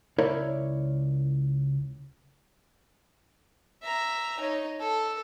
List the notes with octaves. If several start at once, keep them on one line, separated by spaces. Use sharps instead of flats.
C#2 E4 A#4 C#5 D5
E5 A#5
D#4 C#5
A4